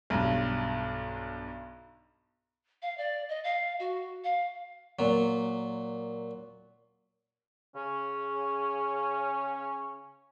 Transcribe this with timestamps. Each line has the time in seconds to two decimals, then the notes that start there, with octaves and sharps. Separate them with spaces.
0.10 B1 G2
2.82 F5
2.98 D5
3.29 D#5
3.44 F5
3.79 F#4
4.24 F5
4.99 A#2 F#3
7.75 C#3 C#4